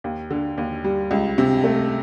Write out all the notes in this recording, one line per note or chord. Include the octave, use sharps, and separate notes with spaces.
D#2
D3
D#2
G3
C#2
C3
A3